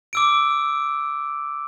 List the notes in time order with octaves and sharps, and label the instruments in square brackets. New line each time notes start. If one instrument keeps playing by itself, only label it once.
[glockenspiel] D6 E6 D7